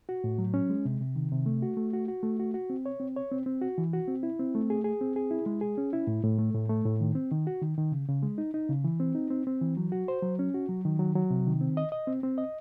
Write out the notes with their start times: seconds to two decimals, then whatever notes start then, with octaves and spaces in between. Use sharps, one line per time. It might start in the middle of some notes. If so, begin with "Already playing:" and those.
0.09 F#4
0.24 A2
0.38 F#3
0.54 C#4
0.69 G#3
0.85 C3
1.00 C3
1.16 D#3
1.32 C3
1.46 A3
1.62 F#4
1.77 A3
1.93 F#4
2.08 F#4
2.23 A3
2.39 F#4
2.54 F#4
2.70 C4
2.86 C#5
3.00 C4
3.16 C#5
3.31 C4
3.46 C4
3.62 F#4
3.78 E3
3.93 F#4
4.08 C4
4.23 E4
4.39 C4
4.55 A3
4.70 G#4
4.84 G#4
5.01 C4
5.16 G#4
5.31 E4
5.46 G#3
5.61 G#4
5.78 C#4
5.93 E4
6.07 A2
6.23 A2
6.39 A3
6.55 A2
6.69 A3
6.85 A2
7.01 D#3
7.15 C4
7.31 D#3
7.47 F#4
7.61 D#3
7.77 D#3
7.92 C#3
8.08 C#3
8.23 G#3
8.38 D#4
8.54 D#4
8.69 C#3
8.84 E3
9.00 C4
9.15 D#4
9.31 C4
9.47 C4
9.61 E3
9.77 F#3
9.92 F#4
10.08 C5
10.22 F#3
10.39 C#4
10.54 F#4
10.69 F#3
10.85 D#3
10.99 F#3
11.15 F#3
11.30 C3
11.47 D#3
11.61 C4
11.77 D#5
11.92 D#5
12.07 C4
12.23 C4
12.38 D#5